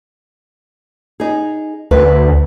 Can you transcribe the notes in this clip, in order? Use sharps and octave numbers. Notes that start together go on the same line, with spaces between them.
D#4 G#4
D2 B4